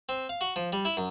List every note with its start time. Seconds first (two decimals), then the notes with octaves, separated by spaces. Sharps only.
0.09 C4
0.29 F5
0.41 F#4
0.56 F3
0.73 G3
0.85 E4
0.97 F#2